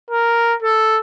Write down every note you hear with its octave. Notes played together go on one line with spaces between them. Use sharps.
A#4
A4